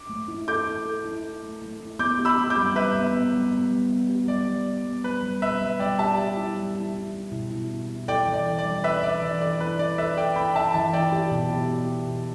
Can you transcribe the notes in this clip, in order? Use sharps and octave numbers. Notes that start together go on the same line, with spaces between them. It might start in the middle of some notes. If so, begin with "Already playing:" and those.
Already playing: D6
A3
E4
A4 D6 G6
E4
A4
E4
E4
A3
A3
E4
B3 D6 G6
G4
B5 E6
G4
D6 G6
G3
G3 B4 E5
B3
B3
G3
B3
G3
B3
G4
G3 D5
G3
B3
B3
G3 B4
G3
B2 B4 E5
G3
G3 D5 G5
G4 E5 A5
G4
E4
G3
E4
E4
E4
B2
E4
E4
E4
A4 D5 G5
E3
D5
E3
D5
G3
G3 B4 E5
E3 D5
E3 D5
A4 D5
E4 B4
E4 D5
A4 B4 E5
A4 D5 G5
E4 G5 B5
E4 E5 A5
E3 E5 A5
E4 D5 G5
G4
B2
G4
G4
B2
B2